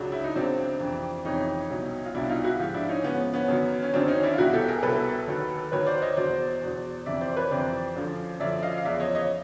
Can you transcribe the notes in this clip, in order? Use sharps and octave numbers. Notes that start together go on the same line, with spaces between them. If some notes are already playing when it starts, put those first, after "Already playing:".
Already playing: C#2 C#3 F#3 D4
E4
D#4
C#2 C#3 F#3 C4 D4
F2 C3 E3
F2 C3 E3 C#4 D#4
C2 B2 F#3
F4
C2 B2 F#3 D4 E4
D#4 F4
E4 F#4
G#2 F3 F4 G4
D4 E4
C#4 D#4
G#2 F3 B3 C#4
B3 C#4
F#2 D#3 F#3
C#4
F#2 D#3 F#3 C4 D4
C#4 D#4
D4 E4
F4
C2 B2 F#3 E4 F#4
G4 A4
G#4 A#4
C2 B2 F#3 A4 B4
D#2 D#3 F#3
D#2 D#3 F#3 B4 C#5
C5 D5
C#5 D#5
E2 B2 F#3 C5 D5
E2 B2 F#3
F2 C3 E3 D5 E5
C5 D5
B4 C#5
F2 C3 E3 C5 D5
F#2 D3 F3
F#2 D3 F3 D5 E5
D#5 F5
F5
E2 C#3 F3 D5 E5
C#5 D#5
C#5 D#5